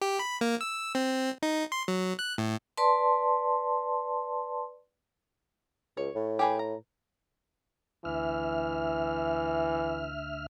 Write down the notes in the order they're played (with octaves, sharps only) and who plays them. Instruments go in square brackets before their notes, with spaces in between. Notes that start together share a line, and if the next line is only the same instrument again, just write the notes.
[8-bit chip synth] G4
B5
A#3
E6
C4
D#4
C6
F#3
F#6
A2
[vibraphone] B4 D5 A5 C6
[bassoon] C#2 [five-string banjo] C#5
[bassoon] A2
[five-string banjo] G4 G#4 B4
A#5
[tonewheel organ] D2 E5 F6 [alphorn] E3